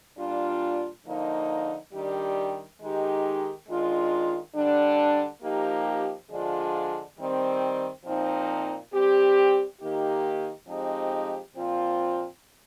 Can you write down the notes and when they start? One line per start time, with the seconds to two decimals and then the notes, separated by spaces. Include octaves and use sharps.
0.18 A#2 G3 D4 F4
1.05 D3 F3 A#3 D#4
1.93 D#3 G3 D4 G4
2.81 D#3 G#3 D#4 G4
3.68 D#3 G#3 D4 F4
4.56 D3 G3 D4
5.43 F3 A#3 D#4 G4
6.31 D3 F3 G#3 D4 F4
7.19 D#3 G3 C4
8.06 A#2 F3 C4 D#4
8.93 G3 C4 G4
9.81 D#3 A#3 D#4 G4
10.68 F3 G#3 C4 D#4 G4
11.55 A#2 F3 C4 F4